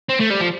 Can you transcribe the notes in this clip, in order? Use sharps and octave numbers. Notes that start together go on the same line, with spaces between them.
C4
A3
G3
F3